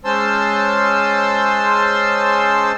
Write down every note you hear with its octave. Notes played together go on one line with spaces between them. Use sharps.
G#3 C#4 C5 A5 C6 E6